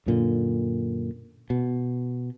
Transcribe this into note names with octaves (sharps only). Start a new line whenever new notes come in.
F#2 A#2 D3
B2